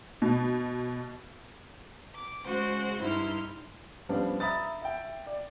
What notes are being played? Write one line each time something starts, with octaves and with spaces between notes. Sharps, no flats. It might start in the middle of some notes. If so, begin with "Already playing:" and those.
B2
D6
C#3 G#3 F#4 C5 F#6
G2 D#4 E4 C6 F6
F3 G3 B3 C#4 D4
E5 A#5 B5 D#6 A6
E5 G5
D5